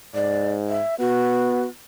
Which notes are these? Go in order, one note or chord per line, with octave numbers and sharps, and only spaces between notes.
G#2 D5
E5
B3 F#4